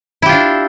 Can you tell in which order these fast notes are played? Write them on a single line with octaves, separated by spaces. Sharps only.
E4 G4 F4 D4